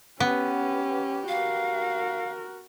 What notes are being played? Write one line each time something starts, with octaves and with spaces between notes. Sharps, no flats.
B3 C#4 G4
F#4 A#4 F5